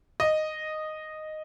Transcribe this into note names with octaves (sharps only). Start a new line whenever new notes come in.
D#5